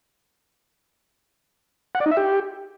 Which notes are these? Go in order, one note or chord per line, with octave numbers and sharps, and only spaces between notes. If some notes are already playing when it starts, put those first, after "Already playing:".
F#5
D5
D#4
E5
G4